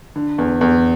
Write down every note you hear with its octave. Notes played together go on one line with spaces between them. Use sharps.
D3
E2
E2